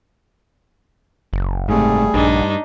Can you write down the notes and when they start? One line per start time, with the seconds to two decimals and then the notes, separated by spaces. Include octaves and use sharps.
1.33 F#1
1.69 G#2 C3 G3 A3 G#4
2.14 A#1 G2 D4 D#4